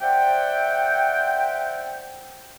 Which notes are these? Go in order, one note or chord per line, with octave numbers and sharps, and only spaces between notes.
C5 D5 E5 F#5 G5